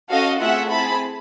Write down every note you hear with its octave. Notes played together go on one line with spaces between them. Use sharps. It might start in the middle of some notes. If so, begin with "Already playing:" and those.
C#4 F#4 A4 D#5 F5
A3 C4 F4 G#4 E5 F#5
C4 E4 G#4 A5 B5